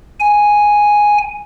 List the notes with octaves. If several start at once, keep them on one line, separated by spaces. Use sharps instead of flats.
G#5